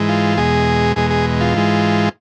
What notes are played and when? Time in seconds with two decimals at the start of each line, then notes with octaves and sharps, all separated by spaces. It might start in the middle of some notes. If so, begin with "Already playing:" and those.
Already playing: G#2 E3 G#3
0.09 F4
0.38 E2 B2 G#3 G#4
0.96 E2 B2 G#3 G#4
1.10 G#4
1.41 F4
1.55 G#2 E3 G#3